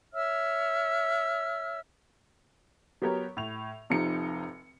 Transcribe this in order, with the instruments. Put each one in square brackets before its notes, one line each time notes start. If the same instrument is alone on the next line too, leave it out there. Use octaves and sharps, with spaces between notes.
[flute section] C#5 E5 E6 F6
[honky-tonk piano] F#3 B3 G4 A#4 C#5
A2 F7
F1 C3 F3 D#4 C#7